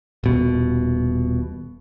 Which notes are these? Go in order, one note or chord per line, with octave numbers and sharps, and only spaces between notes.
D#1 B2